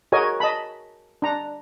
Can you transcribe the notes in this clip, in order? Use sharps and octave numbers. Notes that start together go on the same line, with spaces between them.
F#4 G#4 A#4 C#5 D#5 G#5
D#5 A5 B5
D4 A#5